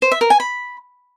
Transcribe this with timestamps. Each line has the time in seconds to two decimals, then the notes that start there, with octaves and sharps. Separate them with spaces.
0.02 C5
0.12 E5
0.21 A#4
0.30 G#5
0.40 B5